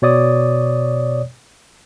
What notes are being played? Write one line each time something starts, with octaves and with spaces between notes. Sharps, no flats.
B2 C#5 D5 D#6